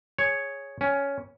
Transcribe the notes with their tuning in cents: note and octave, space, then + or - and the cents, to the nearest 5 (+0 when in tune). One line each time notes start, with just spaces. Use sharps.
G#4 +0 C#5 +0
C#4 +10 G5 +45